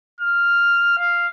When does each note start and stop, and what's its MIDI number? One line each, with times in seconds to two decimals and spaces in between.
0.21 0.93 89
0.98 1.28 77